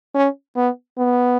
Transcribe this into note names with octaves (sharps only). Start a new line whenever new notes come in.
C#4
B3
B3